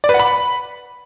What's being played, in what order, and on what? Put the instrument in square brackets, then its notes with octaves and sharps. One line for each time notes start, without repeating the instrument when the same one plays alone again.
[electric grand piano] D5
B4
F#5
B5